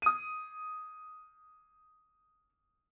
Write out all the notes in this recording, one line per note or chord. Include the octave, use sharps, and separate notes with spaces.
D#6 D#7